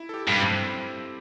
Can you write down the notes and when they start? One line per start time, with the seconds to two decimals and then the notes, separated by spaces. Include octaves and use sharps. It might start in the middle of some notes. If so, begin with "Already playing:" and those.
Already playing: E4
0.09 A4
0.14 G4
0.28 G2
0.42 C4